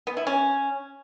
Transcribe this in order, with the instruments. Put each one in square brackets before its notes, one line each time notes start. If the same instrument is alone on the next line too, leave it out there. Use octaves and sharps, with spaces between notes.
[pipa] B3
E4
C#4